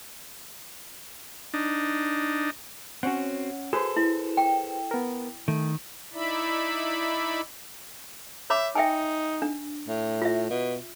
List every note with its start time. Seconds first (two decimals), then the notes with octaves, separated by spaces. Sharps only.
1.54 D4 D#4
3.03 C4 C#4 F#4 C#5 F#5
3.73 F#4 G#4 A4 B4 C5
3.96 E4
4.37 G5
4.91 B3 A#4
5.48 D#3 A3
6.13 D#4 E4 D5 E5 B5
8.50 C#5 E5 B5 D6
8.75 D#4 E5 G5 G#5
9.42 D4
9.88 A2
10.22 F4 E5
10.50 B2